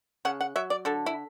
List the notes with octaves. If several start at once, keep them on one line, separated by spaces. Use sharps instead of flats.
C#3 F#5
F#5
F#3 E5
D5
D3 A4
E4